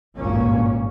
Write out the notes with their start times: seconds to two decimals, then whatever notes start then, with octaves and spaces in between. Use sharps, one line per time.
0.19 G#1 C#2 G2 A#2 A#3 C#4